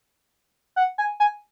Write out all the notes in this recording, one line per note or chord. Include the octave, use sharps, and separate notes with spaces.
F#5
G#5
G#5